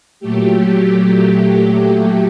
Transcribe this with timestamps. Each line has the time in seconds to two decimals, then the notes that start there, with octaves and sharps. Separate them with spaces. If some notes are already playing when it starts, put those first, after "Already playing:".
0.20 A#2 F#3 A3 G4